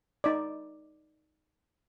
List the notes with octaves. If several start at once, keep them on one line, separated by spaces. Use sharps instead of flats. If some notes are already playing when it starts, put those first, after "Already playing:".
D#4 D5